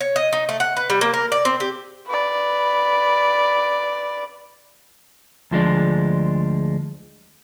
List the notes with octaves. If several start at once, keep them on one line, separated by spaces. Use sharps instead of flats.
C#5
D#5
D#4
A3
F#5
B4
G3
A#3
A#4
D5
C4
G4
B4 D5
D2 F3 G#3 D4